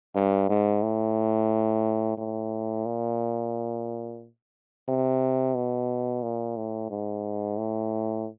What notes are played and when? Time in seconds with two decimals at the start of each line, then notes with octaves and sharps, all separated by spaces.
0.15 G2
0.49 G#2
0.83 A2
2.18 A2
2.86 A#2
4.88 C3
5.55 B2
6.23 A#2
6.57 A2
6.90 G#2
7.58 A2